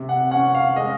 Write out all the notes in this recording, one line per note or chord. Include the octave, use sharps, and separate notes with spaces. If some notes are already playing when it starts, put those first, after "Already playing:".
Already playing: C3
F#5
C#4 F#5
F5
G#3 D#5